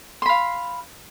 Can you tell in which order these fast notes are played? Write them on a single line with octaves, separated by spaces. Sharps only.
C6 B5 F5